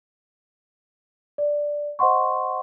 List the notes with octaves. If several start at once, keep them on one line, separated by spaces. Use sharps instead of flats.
D5
C5 D#5 F#5 C6 C#6